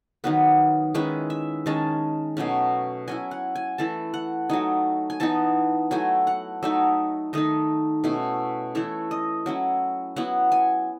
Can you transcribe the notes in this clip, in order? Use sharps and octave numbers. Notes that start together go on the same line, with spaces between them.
D#3 F#3 B3 B4
D#3 G#3 C#4 E4 B4
E5
D#3 G#3 C#4 A5
B2 F#3 A3 C#4
F#3 C#4 E4 G#5
F#5
G#5
E3 A3 E4 A5
F#5
F#3 A3 D#4 G#5
G#5
E3 B3 D#4 A5
F#3 A3 E4 G#5
F#5
F#3 A3 D#4 E5
D#3 A3 D#4 D#5
B2 A3 C#4 E4
E3 A3 E4 C#5
D#5
F#3 C#4 E4
F#3 B3 E4 F#5
G#5